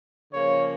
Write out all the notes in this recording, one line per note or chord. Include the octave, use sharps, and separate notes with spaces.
C#3 F3 A#3 C#5